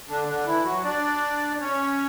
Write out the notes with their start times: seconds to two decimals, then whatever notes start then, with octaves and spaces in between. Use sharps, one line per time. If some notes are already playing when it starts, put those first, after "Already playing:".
0.09 D3 D4
0.28 D3 D4
0.46 E3 E4
0.65 F#3 F#4
0.84 D4 D5
1.60 C#4 C#5